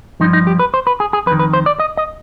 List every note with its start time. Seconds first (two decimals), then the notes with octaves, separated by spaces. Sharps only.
0.20 G2 F3 D#4
0.33 D#4
0.47 G4
0.59 B4
0.74 C5
0.87 B4
1.00 G#4
1.13 G#4
1.26 F2 B4
1.32 D#3
1.39 B4
1.53 C5
1.66 D5
1.80 D#5
1.97 D#5